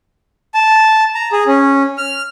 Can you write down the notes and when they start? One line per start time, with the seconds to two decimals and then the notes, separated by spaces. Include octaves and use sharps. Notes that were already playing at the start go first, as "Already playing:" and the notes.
0.54 A5
1.15 A#5
1.32 G#4
1.47 C#4
1.98 F6